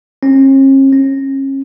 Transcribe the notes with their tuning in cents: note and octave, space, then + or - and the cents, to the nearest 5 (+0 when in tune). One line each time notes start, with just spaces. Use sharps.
C#4 -45
C#4 -35